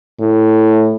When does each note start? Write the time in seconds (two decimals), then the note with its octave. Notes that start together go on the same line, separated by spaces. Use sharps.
0.20 A2